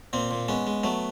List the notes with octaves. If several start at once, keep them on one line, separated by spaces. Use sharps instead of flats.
A#2 A#3 C4
A#2
G#3 B3 C#4
G#3
F#3 A3 B3